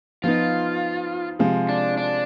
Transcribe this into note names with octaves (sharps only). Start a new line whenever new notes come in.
F3 B3 D#4 F4
C3 F3 G#3
D4
D4